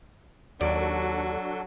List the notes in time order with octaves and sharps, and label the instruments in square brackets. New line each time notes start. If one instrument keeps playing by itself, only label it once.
[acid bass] D#2 [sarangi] F#3 [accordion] D4 F#4 A4 [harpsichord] D5